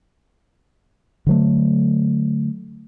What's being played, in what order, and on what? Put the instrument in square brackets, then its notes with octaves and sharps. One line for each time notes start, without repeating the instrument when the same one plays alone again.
[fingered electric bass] D3 F#3 A3